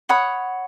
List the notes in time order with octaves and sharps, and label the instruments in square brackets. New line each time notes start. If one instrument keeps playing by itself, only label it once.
[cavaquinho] C#5 F#5 B5 D#6